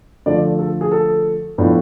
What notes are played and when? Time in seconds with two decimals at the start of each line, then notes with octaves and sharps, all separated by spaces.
0.26 D3 F3 A3 D5
0.59 A4
0.81 G#4
0.91 A4
1.58 A2 F3 B3 D4